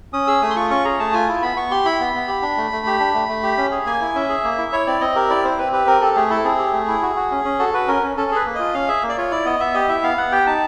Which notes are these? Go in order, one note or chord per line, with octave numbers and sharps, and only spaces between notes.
C#4 D#6
G#4 E6
A3 D#6
C6
F4 C#6
C#4 C#6
G#4 A#5
A3 A5
F4 G#5
E4
B3 B5
B3 C#6
G4 C6
E4 B5
B3
B3
G4
D4
A3
A3
G4
D4
A3
A3
G4
C#4
G#4
A#3 G#5
E4
C#4 E5
G#4
A#3
E4
E4 C#5
C4 D5
C4 D#5
G4 A#4
E4 D5
C4 C5
C4 B4
G4 B4
C4 A#4
G4 A4
A3 G#4
E4 A4
C4 G#4
G4
A3
E4
F#4
F#4
C#4
C#4
F#4 A4
F#4 B4
C#4 A#4
C#4
C#4 A4
G#4 B4
A#3
F4 D#5
C#4 F5
G#4 E5
A#3
D5
F4 C#5
E4 D5
B3 D#5
B3 E5
G4 D#5
E4 E5
B3 F5
B3 F#5
G4 G5
D#4 A5